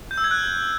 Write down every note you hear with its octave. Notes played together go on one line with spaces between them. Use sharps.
G6
E6
G#6
F#6